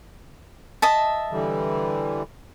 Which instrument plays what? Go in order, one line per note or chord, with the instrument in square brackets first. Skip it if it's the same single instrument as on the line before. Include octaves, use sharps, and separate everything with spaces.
[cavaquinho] D#5 E5 A5
[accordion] D3 E3 G3